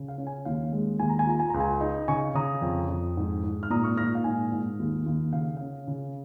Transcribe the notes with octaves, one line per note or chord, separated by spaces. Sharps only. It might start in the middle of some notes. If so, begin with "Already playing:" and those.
Already playing: C#3
F5
C#4
G#5
D#2 F5
G#3
D#2 G#5
A#5
G#5
F4 A#5
G#5
C#2 A#5
G#5
D#4
C#3 G#5 C#6
C#3 A#5 D#6
F2
F2
G#2
G#2
F6
A#2 A#5 D#6
C#6 F6
A#2 F6 A#6
F5
G#2 G#5
G#2
D#2
D#2
C#3 F5
C#4 F5
C#3